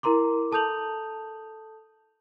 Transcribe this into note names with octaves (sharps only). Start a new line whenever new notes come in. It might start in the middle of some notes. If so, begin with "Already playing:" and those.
E4 A#4 A#5 C6 D6
A4 A5 D#6 G6 F7 F#7